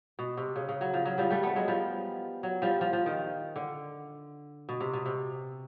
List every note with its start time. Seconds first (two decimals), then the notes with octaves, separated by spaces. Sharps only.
0.19 B2
0.37 C3
0.56 C#3
0.69 C#3
0.81 F#3
0.94 F3
1.05 F#3
1.18 F3 G3
1.30 G3 A3
1.43 A3 B3
1.56 F#3 G#3
1.68 F3 G3
2.43 F#3
2.62 F3 G3
2.81 F3
2.93 F3
3.06 D#3
3.56 D3
4.69 B2
4.80 C3
4.93 B2
5.06 C3